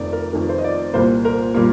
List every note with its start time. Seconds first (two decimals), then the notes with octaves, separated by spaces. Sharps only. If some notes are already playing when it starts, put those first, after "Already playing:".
Already playing: F1 F2 D#3 A3 D5
0.13 A#4
0.33 F1 F2 D#3 A3 A#4
0.49 C5
0.58 D#5
0.64 D5
0.94 C2 A#2 G3 A#3 C5
1.25 A#4
1.54 A#2 G3 A#3